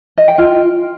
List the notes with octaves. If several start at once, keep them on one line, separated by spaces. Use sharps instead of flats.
D#5
G5
F4